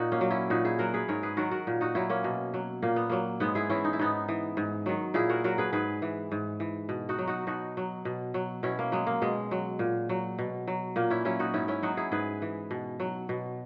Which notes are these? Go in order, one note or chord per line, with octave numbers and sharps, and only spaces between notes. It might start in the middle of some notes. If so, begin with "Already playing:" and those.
Already playing: A#2 D#4 F#4
A#3 C#4
F#3
C#4 E4
A#2 D#4 F#4
E4 G#4
F#3 F#4 A#4
G#4 B4
G#2 A#4 C#5
G#4 B4
D#3 F#3 F#4 A#4
F#4 A#4
A#2
D#4 F#4
F#3 C#4 E4
A#3 C#4
B2
F#3
A#2 A#3
B3
F#3 A#3
G#2 G#3 B3
E4 G#4
E3 C#4 E4
D#4
E4
G#2 B3 D#4
E3
G#2
D#3 F#3
A#2 E4 G#4
F#4 A#4
F#3 F#4 A#4
G#4 B4
G#2 G#4 B4
E3
G#2
E3
B2
D#4 F#4
F#3
D#4 F#4
B2 D#4 F#4
F#3
B2
F#3
B2 C#4 E4
A#3
F#3 G#3
A#3
B2 G#3
F#3
A#2
F#3
B2
F#3
A#2 A#3
C#4 E4
F#3 C#4 E4
D#4 F#4
G#2 C#4 E4
C#4 E4
F#3 D#4 F#4
E4 G#4
G#2 G#4 B4
E3
B2
F#3
B2